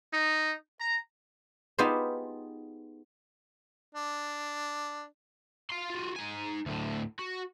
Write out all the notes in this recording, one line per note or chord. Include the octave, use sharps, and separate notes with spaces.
D#4
A#5
B3 D#4 F4 G4 G#4 C5
D4
F5 C6
F4 F#4
D#4 G#5
D2 A2
F#4